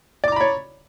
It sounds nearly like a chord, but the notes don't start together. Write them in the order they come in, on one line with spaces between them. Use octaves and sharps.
D5 D6 A#5 B5 C#5